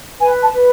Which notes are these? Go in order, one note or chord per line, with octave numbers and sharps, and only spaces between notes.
B4 G#5
A5
B4